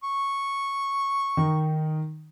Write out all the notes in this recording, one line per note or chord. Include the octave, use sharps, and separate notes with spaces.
C#6
D#3 D#4